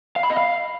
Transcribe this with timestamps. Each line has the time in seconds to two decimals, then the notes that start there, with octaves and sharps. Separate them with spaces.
0.16 F5
0.23 B5
0.30 D#5
0.37 F5